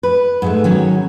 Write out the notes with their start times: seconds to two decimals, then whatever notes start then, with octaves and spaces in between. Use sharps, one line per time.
0.03 B4
0.42 G#2 G#3 A3
0.64 D#3 F#3 C#4